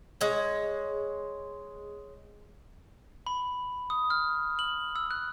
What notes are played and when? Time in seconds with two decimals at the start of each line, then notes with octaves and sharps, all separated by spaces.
0.21 G#3 C#5
3.26 B5
3.90 D#6
4.10 F6
4.59 F#7
4.96 E6
5.11 F#6